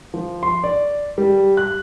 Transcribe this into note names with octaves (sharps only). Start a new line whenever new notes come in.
F3
C6
D5
G3
F#6